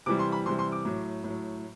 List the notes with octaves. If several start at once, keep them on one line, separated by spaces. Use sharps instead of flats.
C3 E3 G3 D6
C6
B5
C3 E3 G3 C6
C6
D6
A2 F#3
A2 F#3